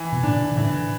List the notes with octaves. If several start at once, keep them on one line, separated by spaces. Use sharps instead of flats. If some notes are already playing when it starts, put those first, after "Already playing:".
Already playing: E3
B2
A2 C#3 D4
D3
A2 C#3 E3